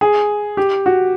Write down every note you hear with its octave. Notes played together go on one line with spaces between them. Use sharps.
G#4
G4
F#4